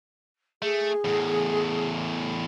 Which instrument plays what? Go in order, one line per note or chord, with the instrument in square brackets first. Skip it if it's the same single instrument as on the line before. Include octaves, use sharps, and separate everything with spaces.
[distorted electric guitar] A3 [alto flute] G#4
[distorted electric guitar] E2 A2